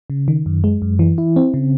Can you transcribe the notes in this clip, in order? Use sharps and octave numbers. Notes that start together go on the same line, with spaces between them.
C#3
D#3
F#2
G#3
F#2
E3
E4
C4
C#3